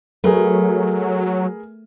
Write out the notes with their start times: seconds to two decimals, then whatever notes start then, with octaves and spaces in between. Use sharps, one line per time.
0.24 F#3 A3 G#4 A#4 B4